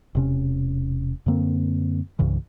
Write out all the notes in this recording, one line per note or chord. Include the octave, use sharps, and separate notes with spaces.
E1 C3 C#4
F#2 D3 A#3 C4
C2 G2 C#3 E3